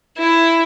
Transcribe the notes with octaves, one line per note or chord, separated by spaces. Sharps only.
E4